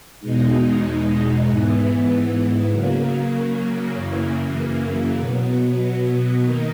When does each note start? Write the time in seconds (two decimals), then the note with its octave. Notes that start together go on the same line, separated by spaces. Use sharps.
0.20 E2 B2 G#3 D#4
1.45 G#2 E3 B3
2.69 C#3 F#3 A#3
3.94 F#2 C#3 E3 A#3
5.17 B2 F#3 B3
6.43 D#3 A#3 D#4